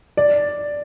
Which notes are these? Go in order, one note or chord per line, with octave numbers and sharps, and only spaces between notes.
D5